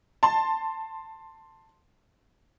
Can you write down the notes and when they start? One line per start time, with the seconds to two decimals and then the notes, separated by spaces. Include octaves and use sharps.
0.23 A5 C6